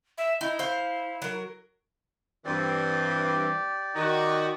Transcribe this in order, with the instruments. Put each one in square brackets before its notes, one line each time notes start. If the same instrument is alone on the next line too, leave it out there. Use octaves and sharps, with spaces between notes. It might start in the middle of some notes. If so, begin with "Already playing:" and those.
[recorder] E5
[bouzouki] D#4 [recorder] E4
[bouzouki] C5 F5
F#3 A#4
[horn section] G2 E3 C4 [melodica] G4 D5
[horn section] D#3 D#4 F#4